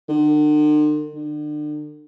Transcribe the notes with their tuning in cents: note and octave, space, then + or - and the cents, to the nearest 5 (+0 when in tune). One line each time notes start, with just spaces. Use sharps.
D3 +45
D3 +35